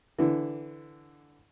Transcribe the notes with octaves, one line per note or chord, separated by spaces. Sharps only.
D3 E3